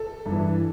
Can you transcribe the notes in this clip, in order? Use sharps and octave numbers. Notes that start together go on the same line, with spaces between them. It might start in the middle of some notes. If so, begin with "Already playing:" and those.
Already playing: A4
G2
E3